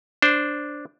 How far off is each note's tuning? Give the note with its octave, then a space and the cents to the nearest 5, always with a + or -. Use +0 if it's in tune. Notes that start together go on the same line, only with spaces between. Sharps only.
D4 +0 C5 +0